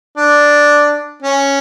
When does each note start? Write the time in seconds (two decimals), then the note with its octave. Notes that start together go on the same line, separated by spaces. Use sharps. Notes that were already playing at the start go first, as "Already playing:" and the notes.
0.17 D4
1.23 C#4